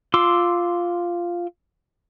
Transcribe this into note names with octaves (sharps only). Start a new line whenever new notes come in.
F4 C6 D6 E6